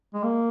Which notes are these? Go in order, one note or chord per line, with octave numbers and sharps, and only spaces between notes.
G#3
A#3